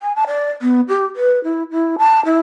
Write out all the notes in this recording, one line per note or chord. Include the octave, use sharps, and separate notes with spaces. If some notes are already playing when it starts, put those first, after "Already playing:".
G#5
A5
D5
B3
G4
B4
E4
E4
A5
E4